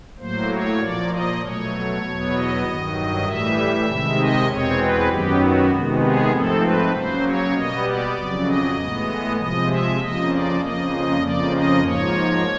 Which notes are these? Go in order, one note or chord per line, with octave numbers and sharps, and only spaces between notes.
A2 F#3 A#3 C5
C#5
A#2 F3 A#3 D5
D#5
B2 F#3 A3 C#5
E2 B2 F#3 B3
D#5
G2 D#3 F#3
A2 E3 G3 E5
C3 D#3 G#3
D#5
E2 B2 G#3 C4 C#5
B4
F#2 D#3 F#3 B3 G4
F#4
C3 D#3 G#3 B3
G#4
G#2 F3 A3 C4 A4
B4
C#3 F#3 A#3 C5
C#5
B2 G3 B3 D#5
D5
F2 C#3 F#3
D#5
A2 E3 G#3 B3
C3 F3 G#3 D#5
E5
F2 C#3 F3 A#3 D#5
D5
F2 C#3 F3 A#3 D#5
F2 C#3 F3 A#3 D5
D#5
G#2 F3 A#3 C#5